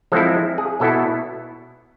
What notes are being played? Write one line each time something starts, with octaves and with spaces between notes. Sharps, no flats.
F3 G#3 C4 E4 A4
G#4
B2 B3 E4 A4